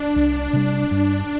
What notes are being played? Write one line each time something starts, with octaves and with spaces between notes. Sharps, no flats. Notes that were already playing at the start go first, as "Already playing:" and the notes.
Already playing: D4
C2
C3 G3
G2 D4